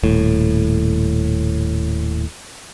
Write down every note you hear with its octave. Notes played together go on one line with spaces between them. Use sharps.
D#1 A2